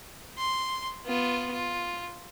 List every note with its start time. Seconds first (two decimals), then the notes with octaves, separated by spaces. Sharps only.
0.38 C6
1.06 B3 F4
1.53 F4